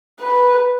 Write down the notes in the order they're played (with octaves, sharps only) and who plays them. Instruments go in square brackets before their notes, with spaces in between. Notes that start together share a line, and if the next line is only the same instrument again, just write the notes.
[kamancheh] B4